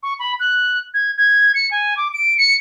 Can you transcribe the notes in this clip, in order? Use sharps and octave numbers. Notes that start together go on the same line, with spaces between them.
C#6
B5
F#6
G#6
G#6
C#7
G#5
D6
D7
C#7